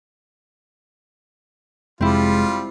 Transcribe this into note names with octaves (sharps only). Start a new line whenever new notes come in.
F1 G3 G#3 C4 E4 F4